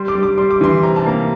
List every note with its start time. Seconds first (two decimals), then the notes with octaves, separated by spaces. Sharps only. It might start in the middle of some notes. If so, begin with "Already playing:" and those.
Already playing: G3 C6
0.08 D6
0.15 G3
0.23 D6
0.38 G3 C6
0.51 D6
0.61 E3 C6
0.83 C3 A#5
0.96 A5
1.06 A#3 A#5